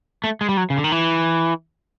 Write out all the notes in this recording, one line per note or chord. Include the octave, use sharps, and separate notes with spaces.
A3
G#3
G3
F#3
C#3
D3
D#3
E3